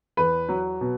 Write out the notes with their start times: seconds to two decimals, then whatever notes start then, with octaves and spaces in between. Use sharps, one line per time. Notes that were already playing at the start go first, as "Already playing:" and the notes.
0.17 E2 B4
0.49 F#3
0.81 B2